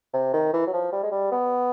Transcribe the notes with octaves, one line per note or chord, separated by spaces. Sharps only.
C3
D#3
E3
F#3
F3
G3
G#3
G3
B3